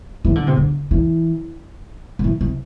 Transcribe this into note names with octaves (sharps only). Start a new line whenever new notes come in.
E3
D3
C3
D3
E3
D3
E3
C3